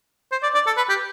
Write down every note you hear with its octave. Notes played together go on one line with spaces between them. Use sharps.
C5
D5
D5
A4
B4
G4